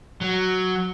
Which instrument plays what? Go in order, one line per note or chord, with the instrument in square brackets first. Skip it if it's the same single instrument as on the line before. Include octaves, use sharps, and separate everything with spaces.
[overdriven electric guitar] F#3